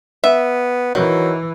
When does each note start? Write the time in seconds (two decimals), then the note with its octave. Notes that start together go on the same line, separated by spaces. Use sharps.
0.24 B3 E5
0.95 D#3 E3 F#3